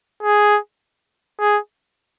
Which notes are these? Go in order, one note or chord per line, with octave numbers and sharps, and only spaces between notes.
G#4
G#4